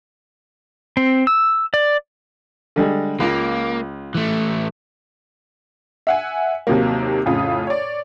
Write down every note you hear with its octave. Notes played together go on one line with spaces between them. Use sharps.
C4
E6
D5
D3 G3 G#3
C#2 A#3 F4
E3 A3
E5 F#5 G#5
D#2 C3 D#3 F#3 A#3
F2 A2 C#3 F4 D#6
C#5 D5